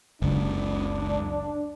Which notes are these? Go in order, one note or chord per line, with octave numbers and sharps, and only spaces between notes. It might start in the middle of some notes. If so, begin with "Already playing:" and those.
F#1 C#2 D4